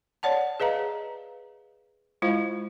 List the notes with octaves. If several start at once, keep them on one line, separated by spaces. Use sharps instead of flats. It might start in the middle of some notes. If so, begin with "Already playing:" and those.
C#5 D5 F#5 A5
G#4 B4 D#5 F5 A#5
G#3 E4 F4 C5 F5